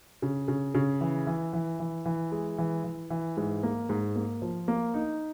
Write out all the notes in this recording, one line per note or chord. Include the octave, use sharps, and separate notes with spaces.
C#3
C#3
C#3
E3
E3
E3
E3
E3
G#3
E3
E3
E3
G#2
A#3
G#2
A#3
F3
A#3
D#4